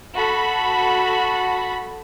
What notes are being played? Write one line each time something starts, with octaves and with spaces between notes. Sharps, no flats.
F#4 A4 B5